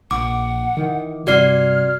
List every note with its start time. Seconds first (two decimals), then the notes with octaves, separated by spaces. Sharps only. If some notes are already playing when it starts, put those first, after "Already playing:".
0.11 A#1 F#5 D6
0.77 D#3 E3
1.27 G2 C3 F#4 D5 F6 C7